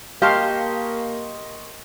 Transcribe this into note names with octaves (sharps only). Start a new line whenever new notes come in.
A#3 G4 D#5 F5 A5 C6 C#6